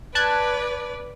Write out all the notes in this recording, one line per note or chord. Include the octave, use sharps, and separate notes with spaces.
B4 D5 A5 F#6 G#6